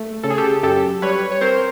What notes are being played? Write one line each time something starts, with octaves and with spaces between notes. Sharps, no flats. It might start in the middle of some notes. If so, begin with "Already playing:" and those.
Already playing: A3
C#3 A4
G#4
G4 A4
F#2 G4 A4
G3 B4 C#5
C#5
C4 A#4 C5